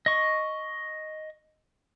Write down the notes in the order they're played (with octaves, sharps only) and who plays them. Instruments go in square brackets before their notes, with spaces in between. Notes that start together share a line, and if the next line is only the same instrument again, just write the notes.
[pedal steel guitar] D#5 C#6